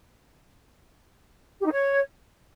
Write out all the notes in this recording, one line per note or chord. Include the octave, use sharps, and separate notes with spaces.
G4
D#4
C#5